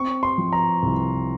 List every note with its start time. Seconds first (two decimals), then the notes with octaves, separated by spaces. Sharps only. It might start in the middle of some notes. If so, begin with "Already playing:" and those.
Already playing: C4 C#6
0.23 C6
0.38 F3
0.53 A#5
0.83 C2